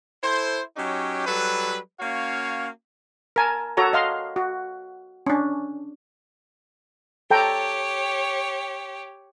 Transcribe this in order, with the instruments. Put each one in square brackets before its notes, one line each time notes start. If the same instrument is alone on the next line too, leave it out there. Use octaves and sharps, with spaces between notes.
[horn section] E4 A4 C5
F#3 C#4 D#4 G4
F#3 G3 A4 B4
A#3 C#4 F#4 C#5 F5
[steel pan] A#4 G#5 A5
F#4 A4 C#5 A#5
D#5 F5 C6
F#4
C#4 D4
[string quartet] G4 C#5 [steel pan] A4 G5 A#5